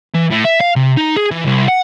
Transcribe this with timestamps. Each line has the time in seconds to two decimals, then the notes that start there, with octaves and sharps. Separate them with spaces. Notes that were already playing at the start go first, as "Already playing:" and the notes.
0.15 E3
0.31 A2
0.45 E5
0.61 F5
0.76 C3
0.97 D#4
1.17 G#4
1.31 E3
1.46 C2
1.68 F#5